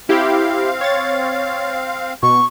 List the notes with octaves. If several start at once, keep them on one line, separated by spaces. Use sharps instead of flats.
C4 E4 G4 F5
C#5 A6
B2 C#6